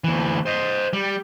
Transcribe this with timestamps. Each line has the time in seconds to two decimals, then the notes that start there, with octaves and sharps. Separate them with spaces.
0.04 D2 E3
0.46 C5 D#5
0.93 G3